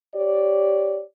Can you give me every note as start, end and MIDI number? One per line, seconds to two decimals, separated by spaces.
0.14 1.01 67
0.14 1.01 73
0.14 1.01 74